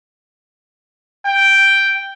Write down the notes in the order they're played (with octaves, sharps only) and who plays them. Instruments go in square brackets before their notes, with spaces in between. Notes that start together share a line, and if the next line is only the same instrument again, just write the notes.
[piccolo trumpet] G5